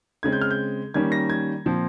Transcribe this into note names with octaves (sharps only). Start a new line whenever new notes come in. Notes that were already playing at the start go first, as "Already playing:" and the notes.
C#3 G#3 C4 G#6
G6
F6
G6
D#3 G3 A#3 C#4 G#6
A#6
G#6
A#2 F3 C4